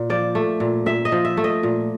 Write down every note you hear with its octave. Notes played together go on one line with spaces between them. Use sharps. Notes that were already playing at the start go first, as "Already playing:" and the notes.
Already playing: A#2
F3 D5
A3
A#2
A#2 E5
D#5
F3
E5
A3
D#5
A#2